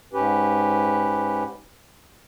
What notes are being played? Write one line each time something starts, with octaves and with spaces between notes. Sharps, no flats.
G#2 C#4 G4 B4